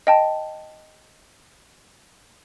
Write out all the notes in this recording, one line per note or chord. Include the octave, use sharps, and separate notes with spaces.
D#5 G5 A5